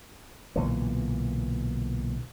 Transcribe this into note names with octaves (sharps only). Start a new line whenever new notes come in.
B1 A#2 D3 E3